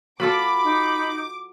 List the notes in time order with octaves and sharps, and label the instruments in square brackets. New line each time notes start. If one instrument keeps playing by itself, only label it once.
[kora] F#3 F4 A4 [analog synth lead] B5 [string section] D6
[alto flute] D#4